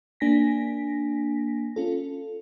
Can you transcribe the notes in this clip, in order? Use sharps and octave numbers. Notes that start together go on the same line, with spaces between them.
A#3 D4 G#5 A#6 B6
C#4 F4 A4